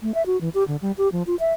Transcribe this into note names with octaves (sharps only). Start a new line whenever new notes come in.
A3
E5
F#4
E3
G4
D3
G3
G4
F3
F4
E5